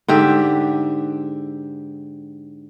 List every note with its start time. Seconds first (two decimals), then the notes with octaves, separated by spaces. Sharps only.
0.08 G#2 D3 G4 E5